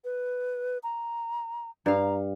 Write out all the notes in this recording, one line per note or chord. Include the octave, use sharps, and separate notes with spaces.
B4
A#5
G2 F5 A#5